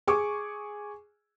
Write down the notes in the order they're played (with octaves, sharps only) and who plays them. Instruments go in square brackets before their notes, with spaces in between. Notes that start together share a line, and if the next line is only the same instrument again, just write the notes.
[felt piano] G#4 C#6 D6